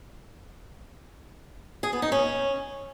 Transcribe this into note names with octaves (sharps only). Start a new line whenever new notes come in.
G#4
B3
D#4
C#4